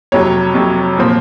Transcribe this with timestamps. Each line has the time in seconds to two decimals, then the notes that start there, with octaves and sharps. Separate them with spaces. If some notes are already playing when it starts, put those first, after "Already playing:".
0.12 F2 C3 F#3 C#5
0.54 F2 C3 F#3
0.98 A#2 F3 C4